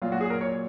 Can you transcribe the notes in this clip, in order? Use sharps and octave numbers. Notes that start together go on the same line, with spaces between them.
A#2 F#3 F4
F#4
G#4
A#4
C#5